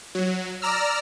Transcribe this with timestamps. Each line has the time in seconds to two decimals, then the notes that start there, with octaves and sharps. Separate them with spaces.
0.15 F#3
0.62 D5 A#5 E6 F6